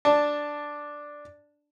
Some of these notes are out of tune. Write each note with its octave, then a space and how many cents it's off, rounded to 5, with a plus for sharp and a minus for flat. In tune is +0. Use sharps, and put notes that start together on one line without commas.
D4 +0 A5 +0